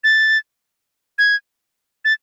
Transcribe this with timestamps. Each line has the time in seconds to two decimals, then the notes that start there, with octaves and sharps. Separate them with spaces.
0.04 A6
1.18 G#6
2.05 A6